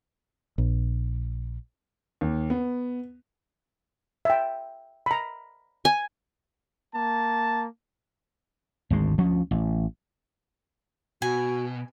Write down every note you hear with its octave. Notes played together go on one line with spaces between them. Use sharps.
A#1
D#2
B3
E5 G5
A#5 B5
G#5
A#3 A5
G#1 D2 G#3
D2 F3 C#4
A1
B2 F#4 G#5